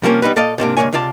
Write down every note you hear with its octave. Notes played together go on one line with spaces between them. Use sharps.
C3 F3 G3 A#3 C4 C#4
G3 B3 D#4 B4
A#2 A4 D5 D#5 F5
G#2 C3 A#3 D4
C#2 G2 C#3 A#3 C#5 G#5
C#2 C3 F4 D5 A5